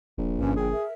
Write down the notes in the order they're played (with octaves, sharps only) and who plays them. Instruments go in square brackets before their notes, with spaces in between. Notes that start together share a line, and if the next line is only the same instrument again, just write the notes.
[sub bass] D#1 [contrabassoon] A#1
[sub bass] G1 [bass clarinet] G2 [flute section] C#4 G#5
[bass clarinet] G#4 [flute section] G5
[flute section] A#4 E5